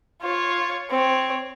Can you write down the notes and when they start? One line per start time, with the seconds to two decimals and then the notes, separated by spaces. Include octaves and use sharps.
0.22 F4 C#5
0.90 C4 C#5